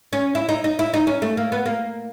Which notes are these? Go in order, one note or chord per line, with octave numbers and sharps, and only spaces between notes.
C#4
E4
D#4
D#4
E4
D#4
C#4
A3
A#3
B3
A#3